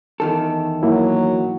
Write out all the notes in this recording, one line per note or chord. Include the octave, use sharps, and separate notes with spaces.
E2 D#3 A4
F#3 A#3 E4